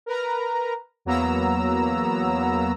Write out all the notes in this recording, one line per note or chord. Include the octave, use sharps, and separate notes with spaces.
A#4 B4 A#5
E2 F#3 A#3 B3 A#5 E6